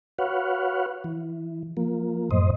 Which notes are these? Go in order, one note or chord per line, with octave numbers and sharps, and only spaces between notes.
F#4 B4 C#5 F5 F#5
E3
F3 A#3
F#2 A2 C5 D#5